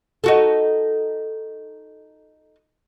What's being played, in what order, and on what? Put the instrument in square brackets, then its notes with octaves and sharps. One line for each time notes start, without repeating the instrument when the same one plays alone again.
[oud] D#4 F#4 A4